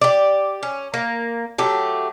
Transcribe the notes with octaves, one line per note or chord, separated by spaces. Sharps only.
G4 D5
C#4
A#3
F#3 A3 G4